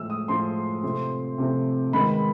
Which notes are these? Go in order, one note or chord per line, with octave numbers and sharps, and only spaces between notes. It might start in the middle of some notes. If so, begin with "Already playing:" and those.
Already playing: A2 F3 G#3 E6
D#6
A2 F3 G#3 C6
C3 F3 A3 C4
C3 F3 A3 C4
G#2 D#3 G#3 B3 B5